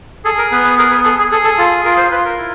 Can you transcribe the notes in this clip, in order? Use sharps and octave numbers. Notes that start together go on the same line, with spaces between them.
G#4 A4
A#4
B3 B4
B4
G#4 A#4
B4
G#4 A4
G#4
G#4 A4
A4
F4 A4
F4 A#4
C5
F4 B4
A#4
E4